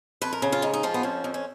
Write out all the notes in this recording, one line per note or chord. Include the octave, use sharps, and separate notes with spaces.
F2 B4
A#4
C#3
F4
G#2 D#4
D#4
F3 F4
B3
F2 C#4
F2
C#4